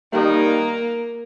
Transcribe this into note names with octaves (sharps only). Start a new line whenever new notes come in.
D#3 G3 A#3 D#4